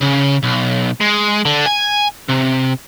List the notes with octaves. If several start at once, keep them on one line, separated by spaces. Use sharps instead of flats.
C#3
B1
G#3
D3
G#5
C3